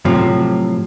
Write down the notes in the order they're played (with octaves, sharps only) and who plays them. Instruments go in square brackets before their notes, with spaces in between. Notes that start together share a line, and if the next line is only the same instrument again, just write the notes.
[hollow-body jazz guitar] A2 C3 F3 F#3